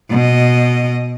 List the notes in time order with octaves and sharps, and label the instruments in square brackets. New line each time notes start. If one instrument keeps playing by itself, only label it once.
[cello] B2 D#5